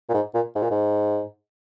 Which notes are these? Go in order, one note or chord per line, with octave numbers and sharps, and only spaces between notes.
A#2
G#2
A#2
G#2
A#2
G#2